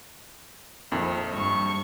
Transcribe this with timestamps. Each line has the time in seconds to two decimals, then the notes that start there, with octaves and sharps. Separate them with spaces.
0.91 A#1 F2 D#3
1.34 G2 C#6